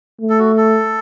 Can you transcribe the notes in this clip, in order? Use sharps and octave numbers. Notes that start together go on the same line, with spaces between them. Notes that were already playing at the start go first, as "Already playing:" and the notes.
A3
A4
F#4
A4